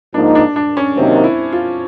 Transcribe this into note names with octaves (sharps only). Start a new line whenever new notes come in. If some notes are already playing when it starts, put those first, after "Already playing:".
G#2 F3 A#3 D4 D#4
D4
D4
C#4
C3 D#3 F#3 A#3 C4 D#4
E4
F4